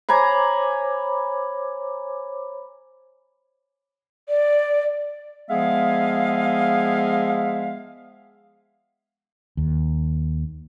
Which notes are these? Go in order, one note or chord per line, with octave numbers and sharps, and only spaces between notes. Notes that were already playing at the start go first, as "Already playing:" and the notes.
C5 C#5 G#5 A#5 B5 D6
D5
F3 G#3 B3 G#4 E5 F5
D#2